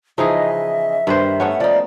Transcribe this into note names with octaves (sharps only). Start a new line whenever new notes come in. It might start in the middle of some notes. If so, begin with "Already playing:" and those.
C#3 E3 F3 D#4 G#4 D#5 E5
G2 D#3 B4 C5
A3 B3 C#4 F#5
F3 D#4 D5